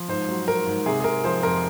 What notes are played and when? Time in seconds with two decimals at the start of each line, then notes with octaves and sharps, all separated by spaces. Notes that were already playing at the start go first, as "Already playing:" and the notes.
Already playing: F3
0.08 G#2 C5
0.29 F#3
0.48 G#2 A#4
0.67 G#2
0.86 C3 G#4
1.00 G#4
1.04 C3 A#4
1.24 F3 C5
1.43 F2 A#4